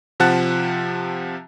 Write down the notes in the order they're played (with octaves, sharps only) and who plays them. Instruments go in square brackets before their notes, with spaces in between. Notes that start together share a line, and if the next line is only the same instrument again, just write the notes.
[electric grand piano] C3 F3 F#5 A5 F#6